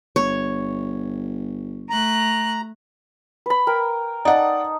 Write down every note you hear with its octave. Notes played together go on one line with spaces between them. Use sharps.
G1 C#5
A3 A#5 F#6
B4 B5
A#4 G5
D#4 D5 F#5 A5